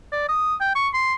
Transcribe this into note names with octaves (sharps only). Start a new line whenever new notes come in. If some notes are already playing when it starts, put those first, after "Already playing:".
D5
D#6
G5
C#6
C6